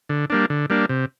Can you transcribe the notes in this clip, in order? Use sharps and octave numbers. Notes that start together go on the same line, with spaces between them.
D3
G3 A#3 D4
D3
G3 A#3 D4
C3